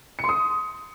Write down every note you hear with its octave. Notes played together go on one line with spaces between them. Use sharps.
C#7
C6
D#6